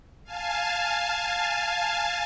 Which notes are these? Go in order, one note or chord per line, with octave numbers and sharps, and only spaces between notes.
F5 G#5 A5